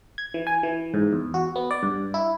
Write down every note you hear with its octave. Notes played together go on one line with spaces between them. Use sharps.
G#6
E3
G#5
E3
G#2
E2
F#4
B3
D5
G2
E4